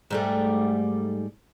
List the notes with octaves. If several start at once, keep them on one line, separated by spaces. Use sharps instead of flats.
G#2 G3 A3